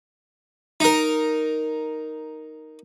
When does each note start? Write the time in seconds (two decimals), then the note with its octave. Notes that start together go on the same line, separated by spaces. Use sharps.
0.80 D#4 A#4